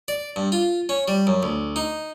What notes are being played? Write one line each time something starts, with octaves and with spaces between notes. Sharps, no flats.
D5
G2
F4
C#4
G3
F#2
D2
D#4